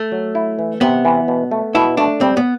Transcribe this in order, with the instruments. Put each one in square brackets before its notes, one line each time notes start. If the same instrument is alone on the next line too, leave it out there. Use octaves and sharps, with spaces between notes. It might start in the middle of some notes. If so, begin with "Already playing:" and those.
Already playing: [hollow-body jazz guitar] A3
[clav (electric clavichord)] F#3
E4
E3
[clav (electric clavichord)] C3 [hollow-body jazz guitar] B3
[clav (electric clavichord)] E3
B2
A3
[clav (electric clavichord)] B2 [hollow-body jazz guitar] E4
[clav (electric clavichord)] A3 [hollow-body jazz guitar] D4
[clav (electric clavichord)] G3 [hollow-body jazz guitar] C4
[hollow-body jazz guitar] B3